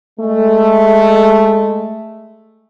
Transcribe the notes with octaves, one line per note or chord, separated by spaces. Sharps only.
G#3 A3